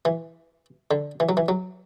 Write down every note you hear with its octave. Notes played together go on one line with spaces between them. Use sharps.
E3
D3
E3
F#3
E3
F#3